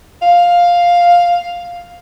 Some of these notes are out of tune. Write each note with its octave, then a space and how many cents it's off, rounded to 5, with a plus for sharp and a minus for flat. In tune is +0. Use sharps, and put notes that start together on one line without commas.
F5 +5